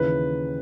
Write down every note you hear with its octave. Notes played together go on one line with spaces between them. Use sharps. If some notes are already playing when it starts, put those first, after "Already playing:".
Already playing: D#2 C#3 E3 B4